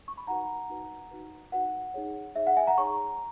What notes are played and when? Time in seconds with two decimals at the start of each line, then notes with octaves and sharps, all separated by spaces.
0.08 C#6
0.18 B5
0.27 D#4 F#4 B4 F#5 A#5
0.70 D#4 F#4 B4
1.11 D#4 F#4 B4
1.52 D#4 F#4 B4 F#5
1.94 D#4 G#4 C#5
2.35 D#4 G#4 C#5 E5
2.47 F#5
2.57 E5 G#5
2.67 F#5 A#5
2.78 D#4 G#4 C#5 A#5 C#6